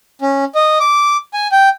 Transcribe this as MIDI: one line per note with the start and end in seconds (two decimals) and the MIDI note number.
0.22 0.45 61
0.55 0.78 75
0.80 1.17 86
1.34 1.48 80
1.52 1.69 79